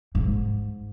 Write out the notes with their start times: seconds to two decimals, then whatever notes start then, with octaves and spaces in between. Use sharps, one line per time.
0.15 G#2